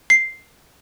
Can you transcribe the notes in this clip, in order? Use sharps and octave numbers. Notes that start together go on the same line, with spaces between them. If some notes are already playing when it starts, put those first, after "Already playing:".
C7